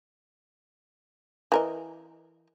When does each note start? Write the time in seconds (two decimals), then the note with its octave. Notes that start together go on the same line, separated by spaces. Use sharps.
1.52 E3 A#4 D#5